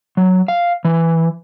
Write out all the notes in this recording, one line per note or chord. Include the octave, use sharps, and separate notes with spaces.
F#3
F5
E3